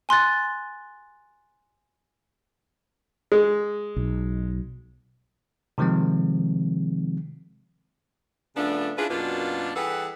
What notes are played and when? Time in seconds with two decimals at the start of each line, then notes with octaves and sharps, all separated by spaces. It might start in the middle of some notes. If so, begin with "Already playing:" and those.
0.09 G#5 C6 F#6 A6
3.32 G#3
3.96 B1
5.78 C3 D#3 F3 G#3 C4
8.56 C#3 F3 A3 B3 D4
8.98 C#4 D4 E4 F4 G#4 B4
9.10 F#2 B2 A#3 D4 F4
9.76 E3 G3 G#4 A4 B4 F#5